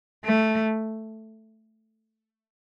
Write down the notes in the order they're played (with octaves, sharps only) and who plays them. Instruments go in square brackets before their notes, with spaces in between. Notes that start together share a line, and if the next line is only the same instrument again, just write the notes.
[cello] A3